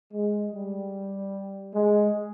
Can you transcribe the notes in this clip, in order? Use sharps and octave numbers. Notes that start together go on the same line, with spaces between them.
G#3
G3
G#3